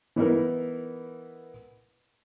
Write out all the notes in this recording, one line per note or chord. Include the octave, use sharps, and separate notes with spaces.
E3 B3 D#4 E4 A#4